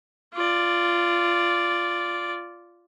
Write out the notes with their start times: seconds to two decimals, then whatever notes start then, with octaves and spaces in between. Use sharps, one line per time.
0.34 F4 D5